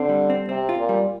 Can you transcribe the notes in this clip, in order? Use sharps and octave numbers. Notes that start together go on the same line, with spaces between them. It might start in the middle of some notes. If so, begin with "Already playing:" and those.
Already playing: D3 C4
G3
C4
C3 C4
F4
A#2
G3